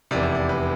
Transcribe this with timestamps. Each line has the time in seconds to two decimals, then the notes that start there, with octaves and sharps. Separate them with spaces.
0.11 F1 E2 C3 D5
0.23 E5
0.35 D5
0.49 B4